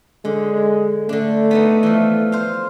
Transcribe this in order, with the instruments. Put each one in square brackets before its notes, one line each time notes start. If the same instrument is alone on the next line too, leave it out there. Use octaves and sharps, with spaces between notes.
[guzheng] D3 [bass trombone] G#3
[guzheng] D3 D4 [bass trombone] A3
[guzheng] B3 D4 D#4
E3 F3
C5 F5